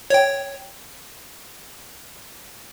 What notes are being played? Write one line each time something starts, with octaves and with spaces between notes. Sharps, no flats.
C#5 G5